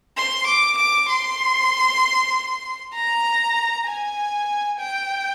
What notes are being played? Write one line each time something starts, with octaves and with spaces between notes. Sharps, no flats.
C6
D6
D6
C6
A#5
G#5
G5